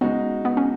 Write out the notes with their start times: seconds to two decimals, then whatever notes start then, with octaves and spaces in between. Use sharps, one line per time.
0.01 C#3 G#3 B3 D#4 F#4
0.45 B3
0.57 C#4